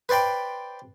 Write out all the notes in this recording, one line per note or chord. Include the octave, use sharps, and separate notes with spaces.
B4 C5 D5 G5 B5